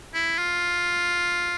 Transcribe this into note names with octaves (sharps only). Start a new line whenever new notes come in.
E4
F4